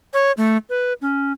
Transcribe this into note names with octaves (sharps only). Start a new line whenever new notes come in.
C#5
A3
B4
C#4